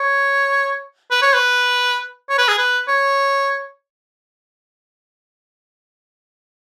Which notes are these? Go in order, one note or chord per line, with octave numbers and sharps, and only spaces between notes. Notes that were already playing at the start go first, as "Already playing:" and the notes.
Already playing: C#5
B4
C#5
B4
C#5
B4
G#4
B4
C#5